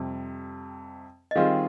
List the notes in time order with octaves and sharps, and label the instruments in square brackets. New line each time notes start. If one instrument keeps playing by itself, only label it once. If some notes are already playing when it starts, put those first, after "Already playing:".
Already playing: [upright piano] F2 C3 G3
[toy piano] D#5
[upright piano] D#3 G3 C4 F4 G#4 [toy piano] F5